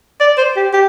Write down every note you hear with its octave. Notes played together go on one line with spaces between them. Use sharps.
D5
C5
G4
G4